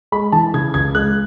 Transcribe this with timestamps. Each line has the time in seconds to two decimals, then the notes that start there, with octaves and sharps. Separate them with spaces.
0.12 G#3 B5
0.32 E3 A5
0.54 C#3 G#6
0.74 C#2 G#6
0.95 G#3 F#6